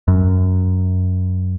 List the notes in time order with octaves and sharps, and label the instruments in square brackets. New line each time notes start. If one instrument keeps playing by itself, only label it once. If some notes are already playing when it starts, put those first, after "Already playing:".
[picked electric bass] F#2